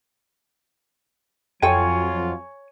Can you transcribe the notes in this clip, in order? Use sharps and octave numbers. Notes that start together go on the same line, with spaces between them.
F2 F#3 F4 A4 C#5 G5 G#5